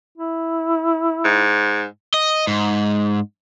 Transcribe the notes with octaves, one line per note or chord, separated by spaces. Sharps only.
E4
G#2
D#5
G#2